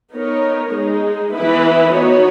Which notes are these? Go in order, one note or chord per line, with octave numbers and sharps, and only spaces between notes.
B3 D#4 A#4 C#5
G#3 D#4 G#4
E3 B3 E4 B4
B3 D#4 F#4 C#5